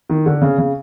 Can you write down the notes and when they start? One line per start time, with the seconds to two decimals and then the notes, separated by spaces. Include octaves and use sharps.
0.10 D#3
0.26 D3
0.41 C#3
0.58 C#3